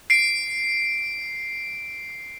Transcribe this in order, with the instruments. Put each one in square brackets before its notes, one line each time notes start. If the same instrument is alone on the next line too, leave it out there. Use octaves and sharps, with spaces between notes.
[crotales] C7 D7